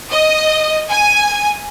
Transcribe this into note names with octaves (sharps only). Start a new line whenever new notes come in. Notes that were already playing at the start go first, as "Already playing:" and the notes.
D#5
G#5